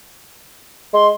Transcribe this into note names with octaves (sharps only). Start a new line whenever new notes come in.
G#3 C6